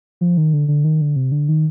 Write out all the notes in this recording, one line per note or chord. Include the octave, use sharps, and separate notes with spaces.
F3
D#3
D3
D3
D#3
D3
C3
D3
D#3